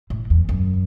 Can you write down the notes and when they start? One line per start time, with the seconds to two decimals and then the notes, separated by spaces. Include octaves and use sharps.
0.10 A2
0.30 E2
0.49 F#2